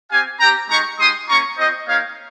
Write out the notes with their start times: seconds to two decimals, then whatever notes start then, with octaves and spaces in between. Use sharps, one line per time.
0.10 C4 G4 F5 G#5
0.40 C4 G4 G5 A#5
0.69 G#3 D#4 G4 A#5 C#6
0.99 G#3 D#4 G4 C6 D#6
1.28 A#3 C#4 F4 A#5 C#6
1.58 C4 F4 C5 D#5
1.87 A#3 D#4 G4 C#5 F5